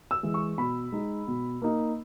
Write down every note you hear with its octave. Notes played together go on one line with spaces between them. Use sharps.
E6
E3 G#3
C#6
B2 B5
G#3 D#4
B2
A#3 D#4